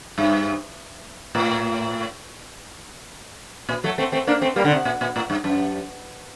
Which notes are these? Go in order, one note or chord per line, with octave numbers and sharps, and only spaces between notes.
G2
A2
A#2
F#3 A3
A3 C4
A3 C4
A#3 D4
A3 C4
G3 A#3
D3
C3
A#2
A#2
A2
G2
F#2